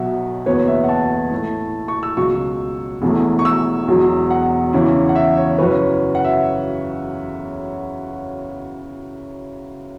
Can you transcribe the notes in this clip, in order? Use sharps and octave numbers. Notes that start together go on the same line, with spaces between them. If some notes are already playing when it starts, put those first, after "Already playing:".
Already playing: B1 B2 F#3 E5 F#5
F#1 E2 B2 B3 C#5
E5
F#5
A5
A2 A3 E4
C#6
E6
C#2 B2 F#3 C#6
E1 E2 E3 A3 E4
C#6
E6
E1 E2 B2 F#3
F#5
E2 C#3 E3 C#4 E4
F#5
E5
C#5
F#2 C#3 E3 C#4 B4
F#5
E5